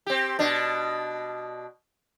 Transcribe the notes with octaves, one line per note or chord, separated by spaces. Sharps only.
C4 G4
B2 D4